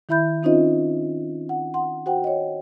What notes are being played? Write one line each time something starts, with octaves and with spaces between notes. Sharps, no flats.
D#3 E4 E5 B5 G6
C4 C#4 D#4 F4 C5 D#5
F#5
F#5 C6
F#4 C5 F#5 G5
C#5 D#5